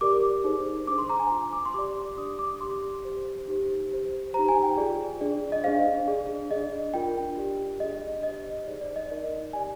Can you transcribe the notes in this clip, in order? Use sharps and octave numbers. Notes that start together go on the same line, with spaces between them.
G4 A#4 D5 D6
D#4 G#4 C5
D4 G#4 C5 D6
C6
A#5
G#5
F4 C5
D6
C6
G4 D5 D6
D4 G4 D5 D#6
D6
G4 D5 C6
G4 C5
D#4 G4 C5
G4 C5
D#4 G4 C5 A#5
G#5
G5
F4 G#4 D5
D4 G#4 D5
D#5
D4 G#4 C5 F5
D4 G#4 D5
D4 G#4 D5 D#5
D4 F4 A#4 G5
G4 D5
D4 G#4 D5 D#5
G4 C5 D#5
D#4 G#4 C5 D5
D5
D#5
D#4 A#4 D5
G4 D5 G#5